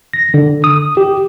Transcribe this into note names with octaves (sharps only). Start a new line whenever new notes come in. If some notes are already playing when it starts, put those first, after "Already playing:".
A#6
D3
D#6
G4